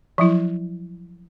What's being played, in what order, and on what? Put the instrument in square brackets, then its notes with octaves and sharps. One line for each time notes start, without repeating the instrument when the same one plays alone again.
[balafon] F3 F#3 E4